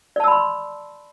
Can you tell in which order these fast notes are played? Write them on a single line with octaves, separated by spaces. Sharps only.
D5 A5 E6 B5 C6